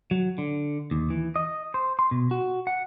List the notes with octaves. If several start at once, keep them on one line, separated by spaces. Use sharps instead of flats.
F#3
D3
D#2
E3
D#5
C5
C6
B2
F#4
F#5